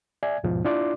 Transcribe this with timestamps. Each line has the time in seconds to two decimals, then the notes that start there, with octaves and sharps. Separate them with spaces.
0.23 D5 E5 G#5 G#6
0.43 D#2 G#2 B2 F3
0.65 D4 E4 F4 D5 C6 D6